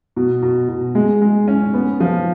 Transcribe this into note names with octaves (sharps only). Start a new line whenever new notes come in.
B2
B2
B2
G#3
G#3
C#4
B3
F3